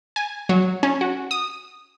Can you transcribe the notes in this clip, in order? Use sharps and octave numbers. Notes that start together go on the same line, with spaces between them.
G#5
F#3
C#4
F#4
D#6